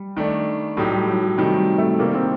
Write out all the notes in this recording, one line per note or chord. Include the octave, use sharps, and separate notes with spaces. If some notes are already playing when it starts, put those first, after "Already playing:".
Already playing: G3
D#3 A3 D4
A2 F#3 A3 D#4 G4
G3
F#3
F#3
C3 D#3 G3 A3
G3
A3
C3 D#3 G3 A#3
C4